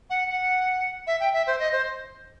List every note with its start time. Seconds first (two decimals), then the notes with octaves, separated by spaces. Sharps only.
0.10 F#5
0.30 F#5
1.07 E5
1.20 G5
1.33 E5
1.47 C5
1.59 D#5
1.72 C5